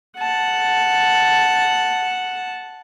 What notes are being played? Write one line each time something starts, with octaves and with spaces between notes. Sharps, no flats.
F#5 A5